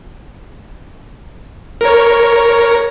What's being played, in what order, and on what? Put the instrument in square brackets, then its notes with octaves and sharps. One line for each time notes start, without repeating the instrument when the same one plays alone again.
[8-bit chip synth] A#4 C#5